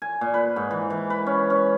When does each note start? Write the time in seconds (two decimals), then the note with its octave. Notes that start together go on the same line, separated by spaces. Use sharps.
0.02 G#5
0.21 A#2
0.34 B4
0.56 G#2
0.71 E3
0.90 E3
1.10 B4
1.26 C#4
1.50 C#4